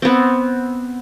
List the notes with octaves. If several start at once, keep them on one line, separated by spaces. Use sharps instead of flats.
B3 C4